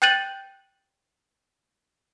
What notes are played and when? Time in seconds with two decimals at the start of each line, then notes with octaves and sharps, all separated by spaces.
0.02 G5 F#6 G6 A6 D#7 F#7